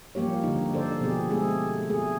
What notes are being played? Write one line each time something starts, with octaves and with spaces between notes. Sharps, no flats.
F3 G3 A#3 G4 C#5
D3 D#4
D3 D#4 A4 C5 D5
B2 F3 B3 G4 G#4
G#3 A3 C4 G#4 A4
A3 G#4